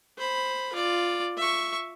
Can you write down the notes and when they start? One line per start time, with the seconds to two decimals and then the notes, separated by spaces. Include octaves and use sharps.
0.18 C5 B5
0.73 F4 D5
1.37 E5 C#6